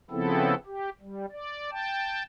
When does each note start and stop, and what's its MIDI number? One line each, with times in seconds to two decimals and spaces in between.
0.11 0.54 49
0.11 0.54 53
0.11 0.54 59
0.11 0.54 60
0.11 0.54 64
0.11 0.54 69
0.66 0.89 67
1.01 1.26 55
1.32 1.70 74
1.71 2.23 79
1.71 2.23 81